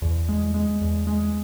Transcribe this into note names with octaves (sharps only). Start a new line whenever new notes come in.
E2
G#3
G#3
E2
G#3